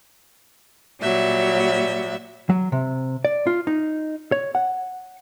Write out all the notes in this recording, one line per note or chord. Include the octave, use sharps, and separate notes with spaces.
A#2 F#3 G3 E5
F#3
C3
D5
F4
D#4
C#5
F#5